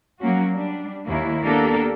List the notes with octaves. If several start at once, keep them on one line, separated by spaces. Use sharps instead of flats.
F#3 A#3 C#4 F#4
G3 D4
D#2 A#3 E4
A#3 B3 D4 G4 A4 A#4